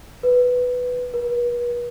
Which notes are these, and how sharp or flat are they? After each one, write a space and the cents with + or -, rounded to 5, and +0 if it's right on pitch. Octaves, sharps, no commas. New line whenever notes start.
B4 +5
B4 -40